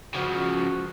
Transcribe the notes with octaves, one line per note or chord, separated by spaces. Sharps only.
C#3 F3 F#4